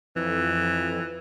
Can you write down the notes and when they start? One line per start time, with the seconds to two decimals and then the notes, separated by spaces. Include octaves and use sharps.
0.16 F2 E3